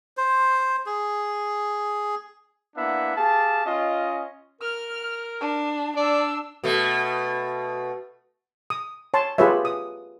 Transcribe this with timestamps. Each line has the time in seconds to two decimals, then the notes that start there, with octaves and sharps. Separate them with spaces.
0.17 C5
0.86 G#4
2.76 A#3 B3 D4 E4 E5 F#5
3.16 G4 G#4 F5 A5
3.66 C#4 F4 D#5
4.61 A#4 F6
5.41 D4
5.97 D4 D5 E6
6.64 B2 A3
8.70 D#6
9.14 C#5 A5 C6
9.38 F4 G4 G#4 B4 C#5 E5
9.65 D#6